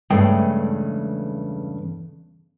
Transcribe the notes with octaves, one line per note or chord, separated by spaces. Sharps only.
E2 G2 C#3 G#3 A3 G5